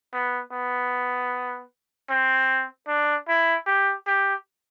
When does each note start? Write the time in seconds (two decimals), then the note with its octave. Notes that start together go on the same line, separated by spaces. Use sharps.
0.13 B3
0.53 B3
2.10 C4
2.88 D4
3.28 E4
3.66 G4
4.07 G4